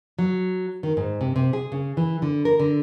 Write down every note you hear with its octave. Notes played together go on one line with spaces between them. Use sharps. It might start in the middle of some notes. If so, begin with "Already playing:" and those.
F#3
D#3
G#2
C3
C3
G#4
C#3
E3
D3
A#4
D3